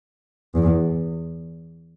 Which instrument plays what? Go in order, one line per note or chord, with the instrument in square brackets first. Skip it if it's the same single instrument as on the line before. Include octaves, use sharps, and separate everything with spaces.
[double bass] E2